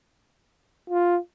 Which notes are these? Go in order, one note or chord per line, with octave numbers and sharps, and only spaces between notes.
F4